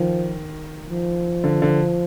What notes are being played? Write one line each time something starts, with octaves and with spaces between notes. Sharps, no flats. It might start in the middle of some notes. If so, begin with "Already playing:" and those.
Already playing: D#3 F3
F3
D3
D3